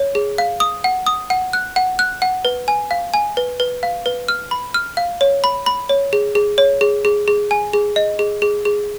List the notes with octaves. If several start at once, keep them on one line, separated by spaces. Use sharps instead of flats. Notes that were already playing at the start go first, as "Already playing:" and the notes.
Already playing: C#5
G#4
F5
D#6
F#5
D#6
F#5
F#6
F#5
F#6
F#5
B4
G#5
F5
G#5
B4
B4
F5
B4
F6
B5
F6
F5
C#5
B5
B5
C#5
G#4
G#4
C#5
G#4
G#4
G#4
G#5
G#4
D#5
G#4
G#4
G#4